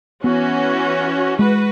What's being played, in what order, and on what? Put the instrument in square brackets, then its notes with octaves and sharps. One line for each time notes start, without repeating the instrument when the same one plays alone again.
[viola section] E3 C#4 F#4 [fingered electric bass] B3
[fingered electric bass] G#3 [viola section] F#4 B4